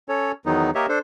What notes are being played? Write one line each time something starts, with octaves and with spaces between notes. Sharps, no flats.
C#4 A4 C#5
E2 D#3 F#3 B3 D#4
A#3 G4 A#4 C#5 D#5 E5
D4 A4 C5